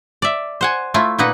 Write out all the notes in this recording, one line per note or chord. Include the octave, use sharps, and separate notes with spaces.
D5 E5
C5 F#5 G#5
A3 E4 F4
A#2 A#3 D#4 B4 F#5